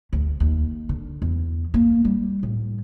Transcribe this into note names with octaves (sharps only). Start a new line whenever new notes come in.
D2
D#2
D3
E2
A#3
G3
A2